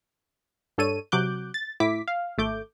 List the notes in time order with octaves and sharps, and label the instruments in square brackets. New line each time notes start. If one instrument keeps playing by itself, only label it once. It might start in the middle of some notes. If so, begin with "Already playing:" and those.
[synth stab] G2 D4 A4 C#5 D#7
C3 F#3 D6 F#6 G6
A6
A2 E4 D6 B6
F5
G#1 A3 D6 G6